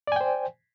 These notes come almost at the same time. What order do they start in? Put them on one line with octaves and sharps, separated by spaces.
D5 G#5 G5 C5